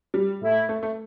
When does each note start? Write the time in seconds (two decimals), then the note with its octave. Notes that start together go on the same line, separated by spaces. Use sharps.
0.14 G3
0.41 A2 A3 E4
0.69 A3
0.83 A3